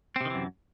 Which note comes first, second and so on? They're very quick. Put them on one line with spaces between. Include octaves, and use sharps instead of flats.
C4 C3 D#3 E3 F#2